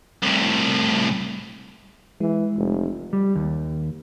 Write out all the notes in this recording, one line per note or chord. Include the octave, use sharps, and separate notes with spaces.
C2 A2
E3 G#3
F1
G3
D#2